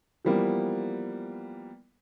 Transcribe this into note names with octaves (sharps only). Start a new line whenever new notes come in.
E3 F3 G3 A#3 B3